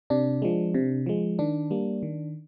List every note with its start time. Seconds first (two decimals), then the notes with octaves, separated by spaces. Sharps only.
0.10 C3 D4
0.42 F3 G#3
0.74 C3
1.06 F3 G#3
1.39 D#3 D4
1.71 G3 A#3
2.03 D#3